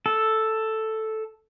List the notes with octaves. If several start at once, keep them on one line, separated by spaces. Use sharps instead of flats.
A4